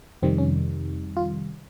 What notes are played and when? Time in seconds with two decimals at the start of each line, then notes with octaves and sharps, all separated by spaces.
0.23 F2 C3 D#3 G3 C4
0.38 C#4
1.17 F4